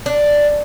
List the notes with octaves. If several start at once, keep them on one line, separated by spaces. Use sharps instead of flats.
D4